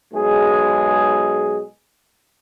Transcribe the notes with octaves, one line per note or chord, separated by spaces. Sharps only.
B1 G#3 G#4